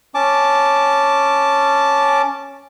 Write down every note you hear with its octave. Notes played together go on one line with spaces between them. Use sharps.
C#4 A5 D6